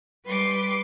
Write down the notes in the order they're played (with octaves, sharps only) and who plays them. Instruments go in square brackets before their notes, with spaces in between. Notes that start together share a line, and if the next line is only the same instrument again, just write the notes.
[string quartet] G3 B4 C6 D6